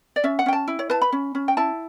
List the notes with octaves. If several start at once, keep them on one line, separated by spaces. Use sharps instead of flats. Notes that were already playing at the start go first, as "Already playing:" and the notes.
D5
C#4 E5
F#5
C#4 G5
A5
E4
C#5
B4 A5
B5
C#4
C#4
G5
E4 A5